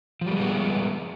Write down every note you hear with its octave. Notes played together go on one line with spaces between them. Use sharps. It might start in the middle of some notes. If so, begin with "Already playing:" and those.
F3 G3 G#3 A#3 B3